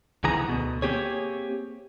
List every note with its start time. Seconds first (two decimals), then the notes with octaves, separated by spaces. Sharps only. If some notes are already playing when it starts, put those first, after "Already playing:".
0.24 C2 D#3 E3 B3 G#4 A#5
0.49 D2 B2
0.82 A#3 C4 G4 G#4 C#5